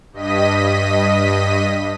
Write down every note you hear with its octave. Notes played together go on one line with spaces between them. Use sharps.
G2 D#5 B6 D#7